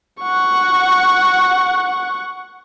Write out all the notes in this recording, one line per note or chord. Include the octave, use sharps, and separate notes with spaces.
F#5 C#6